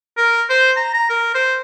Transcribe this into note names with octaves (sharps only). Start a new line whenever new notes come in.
A#4
C5
A#5
A#5
A#4
C5